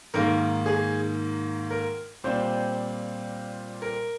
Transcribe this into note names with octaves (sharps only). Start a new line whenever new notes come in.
G#2 D#3 A#3 A#4
G#4
A#4
A#2 G3 C4 C5
A#4